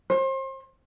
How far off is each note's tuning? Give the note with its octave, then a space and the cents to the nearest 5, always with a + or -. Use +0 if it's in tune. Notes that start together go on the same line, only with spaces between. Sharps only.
C5 +35